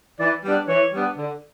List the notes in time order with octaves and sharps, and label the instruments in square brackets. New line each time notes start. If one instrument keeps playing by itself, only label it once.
[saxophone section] E3 [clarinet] D5
[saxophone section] G3 B3 D4
[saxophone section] E3 [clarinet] C#5
[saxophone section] G3 B3 D4
D3